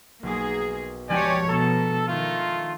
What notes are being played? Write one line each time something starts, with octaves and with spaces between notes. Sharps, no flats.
B1 A#3 G#4 D6
F3 G#3 D4 G4 C#5 D5 G5 G#5
B2 A4 A#5 E6
D#3 A3 F4